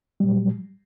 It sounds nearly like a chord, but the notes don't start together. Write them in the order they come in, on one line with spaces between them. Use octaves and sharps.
G3 A#2 F#3